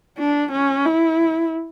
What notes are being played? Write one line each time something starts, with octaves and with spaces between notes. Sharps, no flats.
D4
C#4
E4